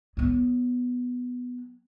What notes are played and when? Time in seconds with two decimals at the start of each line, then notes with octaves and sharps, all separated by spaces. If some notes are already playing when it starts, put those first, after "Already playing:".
0.17 F#3 B3